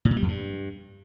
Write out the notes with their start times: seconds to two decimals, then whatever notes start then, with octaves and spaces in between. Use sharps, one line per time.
0.05 A2
0.11 A#2
0.17 G3
0.22 F2
0.28 G2